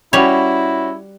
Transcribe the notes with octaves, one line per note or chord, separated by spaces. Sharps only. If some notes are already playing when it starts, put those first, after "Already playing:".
G3 C#4 E4 F#4 C#5